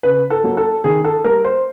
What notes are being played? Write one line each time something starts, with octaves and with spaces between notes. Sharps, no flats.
C#3 B4
A4
F#3 A#3
A4
D#3 G#4
A4
G3 A#3 A#4
C5